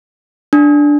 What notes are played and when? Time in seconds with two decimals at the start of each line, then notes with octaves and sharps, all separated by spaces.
0.53 D4